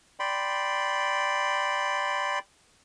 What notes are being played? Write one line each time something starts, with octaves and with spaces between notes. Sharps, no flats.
D5 G5 B5 C6